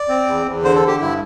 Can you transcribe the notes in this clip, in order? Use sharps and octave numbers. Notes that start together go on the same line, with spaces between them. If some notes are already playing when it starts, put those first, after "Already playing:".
Already playing: D5
C4
E2
E2
D3 C5
A4
D3
G4
G2 E4